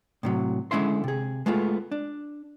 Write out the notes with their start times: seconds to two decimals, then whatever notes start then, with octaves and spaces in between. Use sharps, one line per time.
0.23 A2 C3 F#3
0.71 D3 G#3 C#4 E4 E5 C6
1.04 C3 G#4
1.46 G#3 A3 B3 F4
1.92 D4